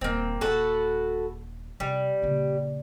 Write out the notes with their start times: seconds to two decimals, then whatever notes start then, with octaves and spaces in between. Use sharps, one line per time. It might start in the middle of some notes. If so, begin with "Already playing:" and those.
0.01 D#1 G3 A#3 C4
0.41 D#1 F#4 A4 B4
1.80 C3 G3
2.22 A#1 C#3